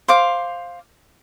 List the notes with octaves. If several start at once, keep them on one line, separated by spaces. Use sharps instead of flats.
C5 F5 D6